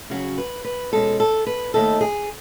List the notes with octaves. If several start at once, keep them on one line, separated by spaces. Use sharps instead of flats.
C#3 F#3 C#4 F#4
B4
B4
B2 G#3 C#4 A4
A4
B4
D#2 D#3 A3 D#4 A4
G#4